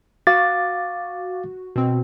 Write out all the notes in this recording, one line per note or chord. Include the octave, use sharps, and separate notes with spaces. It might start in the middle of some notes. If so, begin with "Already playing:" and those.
F#4 F5 D6 A6
B2 C4